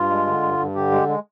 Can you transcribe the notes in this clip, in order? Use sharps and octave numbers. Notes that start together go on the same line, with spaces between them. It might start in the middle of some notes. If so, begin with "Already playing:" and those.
Already playing: G2 F4
G#3
D3
G2
G2
D3 G4
G#3
G#3